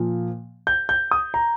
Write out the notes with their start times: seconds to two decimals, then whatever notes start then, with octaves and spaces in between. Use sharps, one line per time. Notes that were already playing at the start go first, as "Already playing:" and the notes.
Already playing: A#2 F3
0.67 G6
0.89 G6
1.11 D#6
1.34 A#5